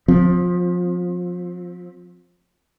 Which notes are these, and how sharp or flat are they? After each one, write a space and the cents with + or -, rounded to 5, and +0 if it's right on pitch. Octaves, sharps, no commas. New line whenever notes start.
F3 +25 C4 +0